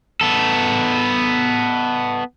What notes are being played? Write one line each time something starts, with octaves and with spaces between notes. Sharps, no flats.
B3 A4